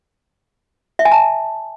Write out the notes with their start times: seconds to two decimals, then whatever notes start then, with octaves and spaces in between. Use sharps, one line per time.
0.99 E5
1.05 G#5
1.12 A5